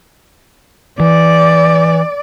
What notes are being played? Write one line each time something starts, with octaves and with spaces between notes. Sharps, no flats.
E3 D5